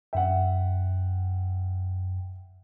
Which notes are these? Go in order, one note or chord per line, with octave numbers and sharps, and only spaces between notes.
F#2 E5 F#5 G5